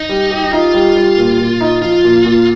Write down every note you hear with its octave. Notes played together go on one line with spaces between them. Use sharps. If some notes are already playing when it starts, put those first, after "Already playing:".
Already playing: D#4
G3
G4
D#4 F4
G3
G3
A#2
A#2
D#4
F3 F4
A#2
A#2